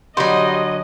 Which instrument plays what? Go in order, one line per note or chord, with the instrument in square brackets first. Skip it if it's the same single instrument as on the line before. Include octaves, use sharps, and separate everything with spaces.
[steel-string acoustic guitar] D3 F#3 [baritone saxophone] G3 [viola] D#5 [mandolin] C6